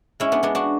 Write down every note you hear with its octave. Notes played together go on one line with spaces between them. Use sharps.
G#3 C#4 E4
B3 D4
G#3 B3 D4
D4 F#4